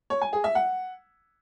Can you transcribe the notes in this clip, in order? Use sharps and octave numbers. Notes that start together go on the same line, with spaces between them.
C#5
G#5
G#4
E5
F#5